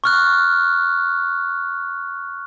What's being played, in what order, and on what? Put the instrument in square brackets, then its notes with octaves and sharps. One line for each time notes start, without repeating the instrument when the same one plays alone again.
[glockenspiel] C#6 F6 F#6